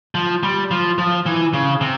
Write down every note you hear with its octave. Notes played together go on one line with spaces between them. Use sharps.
F3
G3
F3
F3
E3
C#3
C3